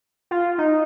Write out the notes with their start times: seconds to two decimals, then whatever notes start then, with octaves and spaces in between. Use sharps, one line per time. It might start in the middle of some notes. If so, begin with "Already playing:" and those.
0.31 F4
0.58 D#4